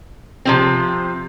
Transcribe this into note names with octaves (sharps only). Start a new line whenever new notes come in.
C3 F3 C4